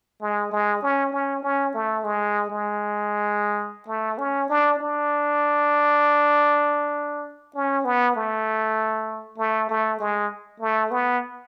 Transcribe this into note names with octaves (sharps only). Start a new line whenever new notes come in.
G#3
G#3
C#4
C#4
C#4
A3
G#3
G#3
A3
C#4
D4
D4
C#4
B3
A3
A3
A3
G#3
A3
B3